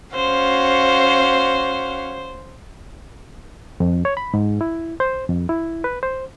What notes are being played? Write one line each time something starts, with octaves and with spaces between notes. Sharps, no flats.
C#4 F#4 C5 F5
F2
C#5
B5
G#2
E4
C5
F2
E4
B4
C5